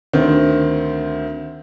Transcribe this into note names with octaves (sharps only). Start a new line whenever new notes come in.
D2 D#3 C4